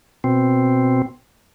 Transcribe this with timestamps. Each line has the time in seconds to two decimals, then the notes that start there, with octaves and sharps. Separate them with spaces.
0.24 B2 C4